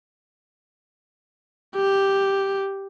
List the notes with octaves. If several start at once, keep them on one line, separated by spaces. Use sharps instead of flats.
G4